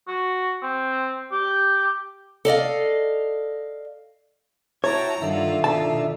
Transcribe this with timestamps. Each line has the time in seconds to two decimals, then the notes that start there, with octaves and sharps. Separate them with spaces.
0.08 F#4
0.63 C4
1.32 G4
2.45 A4 D5 D#5 F5
4.84 E4 F#4 C#5 G5 A5 A#5
5.22 G2 D#3 D4 F4 A4 E5 F#5
5.64 B2 F4 A4 A5 A#5